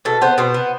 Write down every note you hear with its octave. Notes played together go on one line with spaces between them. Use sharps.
B2 A4
B3 C5
B2 C5
B3